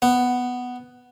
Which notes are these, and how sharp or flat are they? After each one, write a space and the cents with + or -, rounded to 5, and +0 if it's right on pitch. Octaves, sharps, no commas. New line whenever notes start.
B3 +5